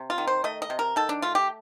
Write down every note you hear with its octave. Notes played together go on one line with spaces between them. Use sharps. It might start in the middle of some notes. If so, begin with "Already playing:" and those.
Already playing: C3
F4
D#3
C5
A3 D#5
D#5
C3
A#4
D#3 A4
D4
A3 F4
G4